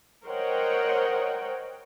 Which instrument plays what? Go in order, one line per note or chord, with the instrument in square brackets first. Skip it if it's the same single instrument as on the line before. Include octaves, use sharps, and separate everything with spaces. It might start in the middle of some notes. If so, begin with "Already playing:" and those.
[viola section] A#4 C5 C#5 D#5 F#5 G5